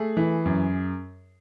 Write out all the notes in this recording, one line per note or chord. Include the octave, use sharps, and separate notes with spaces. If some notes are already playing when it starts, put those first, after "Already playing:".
Already playing: A3 G#4
E3
F#2